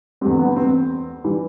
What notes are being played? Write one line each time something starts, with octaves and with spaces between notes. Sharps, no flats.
E2 D3 G3 C4
B3
C4
E3 G3